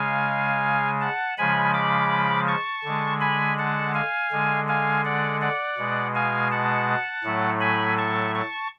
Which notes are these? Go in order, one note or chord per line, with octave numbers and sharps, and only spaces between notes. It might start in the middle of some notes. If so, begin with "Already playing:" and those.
Already playing: C#3 G#3 F5 G#5
F#5 A5
C#3 F3 G#3 G#5 B5
B5 D6
A5 C#6
D3 G#3
G#5 B5
F#5 A5
F5 G#5
D3 G#3
F5 G#5
D5 F#5
D5 F#5
B2 G#3
F5 G#5
F#5 A5
A2 F#3 A3
G#5 B5
A5 C#6
A5 C#6